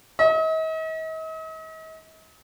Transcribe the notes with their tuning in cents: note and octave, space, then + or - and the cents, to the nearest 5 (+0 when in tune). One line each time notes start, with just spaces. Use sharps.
D#5 +45